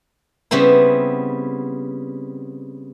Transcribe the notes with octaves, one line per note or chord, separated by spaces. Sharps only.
C#3 G3 B3 C4 E4